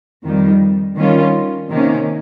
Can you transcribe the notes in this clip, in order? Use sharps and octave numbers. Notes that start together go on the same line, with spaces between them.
F2 D#3 G3
D#3 G3 C#4 F4
C3 D#3 A#3 C#4